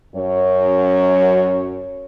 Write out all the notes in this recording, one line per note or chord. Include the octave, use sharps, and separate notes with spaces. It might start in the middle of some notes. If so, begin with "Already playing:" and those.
F#2 C#5